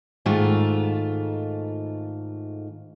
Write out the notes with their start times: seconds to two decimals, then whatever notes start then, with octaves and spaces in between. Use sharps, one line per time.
0.26 G#2 D#3 A3 F4